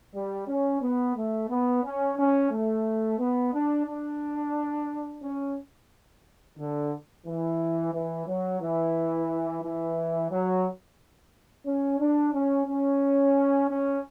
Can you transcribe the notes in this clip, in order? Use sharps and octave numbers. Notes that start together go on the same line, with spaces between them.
G3
C#4
B3
A3
B3
C#4
C#4
A3
B3
D4
D4
C#4
D3
E3
E3
F#3
E3
E3
F#3
C#4
D4
C#4
C#4
C#4